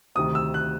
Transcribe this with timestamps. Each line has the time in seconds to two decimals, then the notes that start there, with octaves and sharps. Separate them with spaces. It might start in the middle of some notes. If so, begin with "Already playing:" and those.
0.15 D2 C3 D#3 D#6
0.35 E6
0.54 F#6